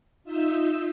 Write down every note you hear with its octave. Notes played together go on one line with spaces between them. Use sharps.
D#4 F4 E5 D#6 E6 G6